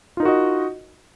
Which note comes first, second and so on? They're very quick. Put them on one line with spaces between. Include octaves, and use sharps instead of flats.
F4 D#4 A#4 F#4 D#5